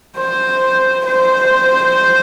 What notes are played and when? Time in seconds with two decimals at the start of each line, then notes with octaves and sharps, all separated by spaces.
0.17 C5
1.06 C5